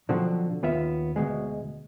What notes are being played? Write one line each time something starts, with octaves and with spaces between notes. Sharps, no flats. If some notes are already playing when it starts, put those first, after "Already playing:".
B2 D3 F3 F#3 C4 F#4
D#2 B3 F4 E5
D2 G2 B2 G#3